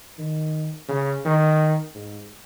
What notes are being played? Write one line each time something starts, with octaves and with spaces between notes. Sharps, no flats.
D#3
C#3
D#3
G#2